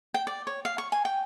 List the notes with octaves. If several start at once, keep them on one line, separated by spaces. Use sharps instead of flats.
G5
D5
C#5
F5
C#6
G#5
G5